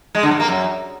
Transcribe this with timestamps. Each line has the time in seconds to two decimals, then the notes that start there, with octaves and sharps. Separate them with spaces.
0.15 G#3
0.23 D3
0.31 G2
0.40 A#3
0.48 F#2